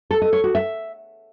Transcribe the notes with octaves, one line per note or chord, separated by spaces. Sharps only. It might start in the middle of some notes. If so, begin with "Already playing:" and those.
A4
D#5
C#5
F#4
E5